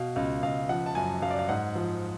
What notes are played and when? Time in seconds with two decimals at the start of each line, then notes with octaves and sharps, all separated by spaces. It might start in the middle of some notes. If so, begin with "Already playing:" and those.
Already playing: B2 F5
0.16 C#2 F5
0.43 C#2 F5
0.69 F3 F#5
0.86 A5
0.95 F#2 G#5
1.22 F#2 F5
1.30 D5
1.39 F5
1.49 G#2 F#5
1.75 F3